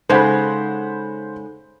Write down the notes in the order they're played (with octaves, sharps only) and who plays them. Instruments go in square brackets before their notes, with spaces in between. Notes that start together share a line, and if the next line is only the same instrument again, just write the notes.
[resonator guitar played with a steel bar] C#3 G#3 [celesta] D#4 A4 [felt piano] C5 F#5 B5